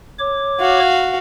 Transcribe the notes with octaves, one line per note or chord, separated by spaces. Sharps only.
C#5 D6
F#4 F5